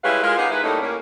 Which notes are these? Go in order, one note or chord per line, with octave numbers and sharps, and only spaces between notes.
G3 G#3 C#4 E4 B4 F5
G#3 F4 A#4
B3 D#4 G4 G#4 F5 F#5
D#3 G#3 E4 B4
A2 G3 A3 A#3 C#4 D#4
A2 A#3 C#4